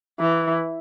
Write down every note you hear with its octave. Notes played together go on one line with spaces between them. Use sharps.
E3